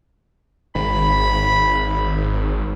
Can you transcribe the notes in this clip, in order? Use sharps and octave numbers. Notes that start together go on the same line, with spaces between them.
G#1 B5